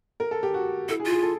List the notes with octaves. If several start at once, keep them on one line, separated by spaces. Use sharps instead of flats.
A#4
A4
G4
F#4
E4 A4
G#4
F4
G#4
A4